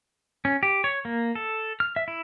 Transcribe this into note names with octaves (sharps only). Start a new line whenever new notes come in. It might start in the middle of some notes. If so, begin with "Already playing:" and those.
C#4
G4
C#5
A#3
A4
F6
E5
E4